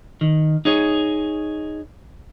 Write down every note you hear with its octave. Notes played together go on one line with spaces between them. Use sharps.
D#3
D#4 G#4 C#5